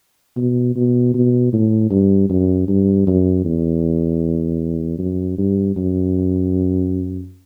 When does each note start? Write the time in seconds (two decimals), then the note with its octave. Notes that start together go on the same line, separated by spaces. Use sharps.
0.37 B2
0.76 B2
1.14 B2
1.53 A2
1.91 G2
2.29 F#2
2.68 G2
3.07 F#2
3.45 E2
4.98 F#2
5.38 G2
5.76 F#2